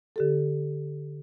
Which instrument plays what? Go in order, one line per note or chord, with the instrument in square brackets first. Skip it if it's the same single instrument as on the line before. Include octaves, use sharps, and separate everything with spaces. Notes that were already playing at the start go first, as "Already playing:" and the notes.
[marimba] D3 G4 A4